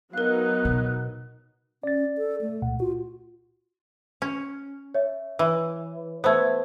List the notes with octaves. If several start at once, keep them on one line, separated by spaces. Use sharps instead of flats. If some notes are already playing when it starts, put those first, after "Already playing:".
F#3 B3 D#4 A#4 F5 F#6
B2
C#4 D5 A6
A4
A3
C#2 A#2 F#5
F4 F#4
C#4
C#5 E5
E3
A3 B3 C5 G#6